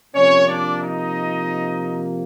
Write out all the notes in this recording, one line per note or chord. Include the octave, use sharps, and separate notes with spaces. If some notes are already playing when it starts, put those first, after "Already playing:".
C3 F3 A#3 C#4 C#5
D4 D5
D#4 D#5